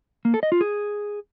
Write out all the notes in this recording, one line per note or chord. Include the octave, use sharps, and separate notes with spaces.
A#3
A4
D#5
F4
G#4